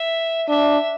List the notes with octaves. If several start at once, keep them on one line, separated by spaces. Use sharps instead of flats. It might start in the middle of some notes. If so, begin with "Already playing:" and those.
Already playing: E5
D4 E5